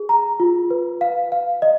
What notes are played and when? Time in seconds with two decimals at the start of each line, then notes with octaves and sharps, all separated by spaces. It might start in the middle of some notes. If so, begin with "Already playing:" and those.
Already playing: G#4
0.09 A#5
0.40 F4
0.71 B4
1.01 F5
1.32 F5
1.62 D#5